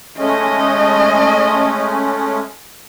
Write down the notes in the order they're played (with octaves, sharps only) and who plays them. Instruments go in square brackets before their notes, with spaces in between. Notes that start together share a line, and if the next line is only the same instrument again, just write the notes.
[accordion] G#3 A3 C#4 [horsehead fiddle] D#5